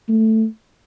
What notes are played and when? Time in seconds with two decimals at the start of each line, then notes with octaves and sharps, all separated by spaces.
0.09 A3